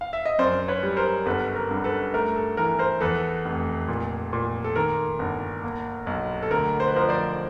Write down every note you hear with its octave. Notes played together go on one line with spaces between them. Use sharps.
F5
E5
D#5
F#2 C5 D5
B4 C#5
G3
A#4 C5
G1 A4 B4
A#4
G2
A4 B4
A3 A#4
A4
E3 A#4
A#4 C5
E2 A4 B4
F1
A#2
A#2
A4
D#3 A#4
G1
A#3
B1
A4
D2 A#4
C5
B4
F3 A#4 C5
C5 D5